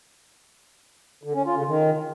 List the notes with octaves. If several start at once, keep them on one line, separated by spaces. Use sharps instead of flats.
D3
C#4
F4
C#3
D#3